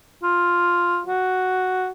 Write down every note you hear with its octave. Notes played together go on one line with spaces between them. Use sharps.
F4
F#4